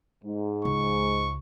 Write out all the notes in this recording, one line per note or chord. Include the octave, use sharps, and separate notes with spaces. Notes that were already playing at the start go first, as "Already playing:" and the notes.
G#2
C#2 C#6